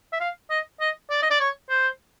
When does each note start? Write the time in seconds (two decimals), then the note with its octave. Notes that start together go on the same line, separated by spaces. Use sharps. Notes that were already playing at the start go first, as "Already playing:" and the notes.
0.13 E5
0.20 F5
0.50 D#5
0.81 D#5
1.10 D5
1.22 D#5
1.31 D5
1.40 C#5
1.70 C5